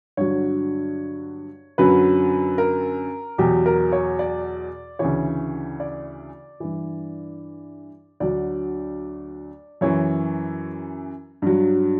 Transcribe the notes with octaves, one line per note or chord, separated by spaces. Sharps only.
G2 D3 F#3 C#5
F#2 D3 F#3 B4
A#4
E2 B2 F#3 G4
A#4
C#5
D5
D2 C#3 E3 C#5
D5
G2 E3
D2 D3 F#3 D5
F#2 E3 C#5
G2 F#3